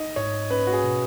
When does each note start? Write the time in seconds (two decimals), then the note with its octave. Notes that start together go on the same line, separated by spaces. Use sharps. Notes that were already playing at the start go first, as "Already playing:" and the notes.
Already playing: D#4 D#5
0.16 G#2 C#5
0.51 C#4 B4
0.67 F#4
0.73 G#4
0.84 B2